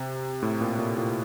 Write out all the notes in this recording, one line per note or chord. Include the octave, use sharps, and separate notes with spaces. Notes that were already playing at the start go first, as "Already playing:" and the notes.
Already playing: C3
A2
A#2
A#2
A#2